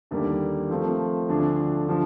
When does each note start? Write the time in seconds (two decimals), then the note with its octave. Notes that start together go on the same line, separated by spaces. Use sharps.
0.11 D#2 D3 G3 A#3
0.69 F3 A3 C4 F4
1.29 D2 D3 F3 A3 D4
1.88 D3 F3